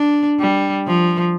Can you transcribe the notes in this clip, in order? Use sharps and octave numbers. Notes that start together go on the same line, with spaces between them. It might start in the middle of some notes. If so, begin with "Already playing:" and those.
Already playing: D4
G3
F3